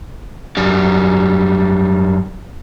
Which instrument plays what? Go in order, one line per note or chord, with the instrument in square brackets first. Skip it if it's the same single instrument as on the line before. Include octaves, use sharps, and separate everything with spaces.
[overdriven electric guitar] F#2 G3